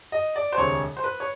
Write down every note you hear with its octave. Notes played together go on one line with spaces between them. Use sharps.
D#5
D5
C5
E1 D2 C3 C#5
C5
B4
C#5